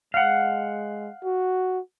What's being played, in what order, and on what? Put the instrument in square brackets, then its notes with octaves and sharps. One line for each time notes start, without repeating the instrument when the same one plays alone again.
[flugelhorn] G#3 [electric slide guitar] F5 F#5
[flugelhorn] F#4